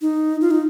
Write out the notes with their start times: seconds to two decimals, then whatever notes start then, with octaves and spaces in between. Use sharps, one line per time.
0.01 D#4
0.41 F4
0.51 D#4